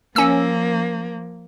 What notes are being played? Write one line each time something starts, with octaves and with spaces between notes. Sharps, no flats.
F3 A#3 C#4 E6